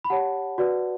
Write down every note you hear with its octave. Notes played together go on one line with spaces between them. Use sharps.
B5
G4 C#5 F#5 A5
F#4 B4 D5